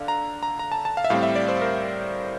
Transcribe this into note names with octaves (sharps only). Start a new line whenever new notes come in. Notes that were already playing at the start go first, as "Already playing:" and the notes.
Already playing: D3 D5 F5
A#5
A#5
A#5
A5
A5
F5
E5
A2 G3 C4 F5
E5
D5
C5
A#4